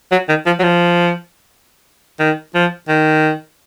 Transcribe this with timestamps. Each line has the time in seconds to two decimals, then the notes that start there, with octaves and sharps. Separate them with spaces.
0.12 F#3
0.29 D#3
0.46 F3
0.60 F#3
0.63 F3
2.20 D#3
2.55 F3
2.88 D#3